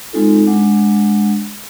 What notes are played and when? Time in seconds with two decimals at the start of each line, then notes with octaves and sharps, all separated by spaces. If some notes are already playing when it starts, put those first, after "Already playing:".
0.13 G#3 C4 D#4 F4 A4
0.47 G#3 D4 F#5